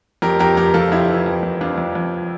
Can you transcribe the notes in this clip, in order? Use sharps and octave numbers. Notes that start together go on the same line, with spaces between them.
F2 G4 A#4
F2 G4 A#4
F2 G4 A#4
F2 F4 A4
F2 E4 G4
E3
F2
F2
F2 D4 F4
F2
F2